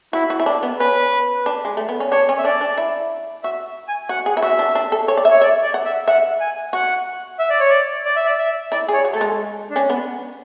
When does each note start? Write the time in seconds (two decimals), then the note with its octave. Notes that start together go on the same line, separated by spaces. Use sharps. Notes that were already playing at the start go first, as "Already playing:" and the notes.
0.13 E4 F#4
0.30 F#4
0.40 E4
0.46 D4
0.63 B3
0.79 C#4 B4
1.46 D4
1.65 G#3
1.77 A3
1.89 B3
2.00 C#4
2.12 D4 C#5
2.29 C#4
2.38 E5
2.44 D4 D5
2.61 D4
2.78 E4
3.43 F#4 E5
3.88 G#5
4.09 F#4 F#5
4.26 G#4
4.37 E4
4.43 F#4 E5
4.59 D4
4.75 D4
4.92 A4
5.08 C#5
5.17 D5
5.25 E5
5.30 C#5
5.41 D5 E5
5.63 D5
5.74 F#5
5.85 E5
6.08 E5 F#5
6.40 G#5
6.73 F#4 F#5
7.39 E5
7.50 D5
7.60 C#5
7.70 D5
8.05 D5
8.16 E5
8.26 D5
8.38 E5
8.72 E4 D5
8.89 G#4 C#5
9.05 F#4
9.13 A3 A4
9.21 G#3
9.70 D4
9.76 C#4
9.90 B3